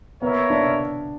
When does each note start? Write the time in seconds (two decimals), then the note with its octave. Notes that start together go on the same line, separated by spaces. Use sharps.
0.22 A#3 B3 E4 A#4 C#5 E5
0.50 D4